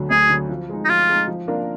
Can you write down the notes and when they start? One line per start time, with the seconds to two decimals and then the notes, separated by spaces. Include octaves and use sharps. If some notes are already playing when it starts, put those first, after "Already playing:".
Already playing: D2 D3 F#3
0.10 D2 G#4
0.30 D3 F#3
0.49 F3
0.69 G#3 D#4
0.85 D#4
0.89 F3 F4
1.09 G#3 D#4
1.28 F3
1.48 A#3 D4 F4 A#4